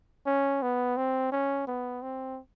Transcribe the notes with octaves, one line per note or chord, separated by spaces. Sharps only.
C#4
B3
C4
C#4
B3
C4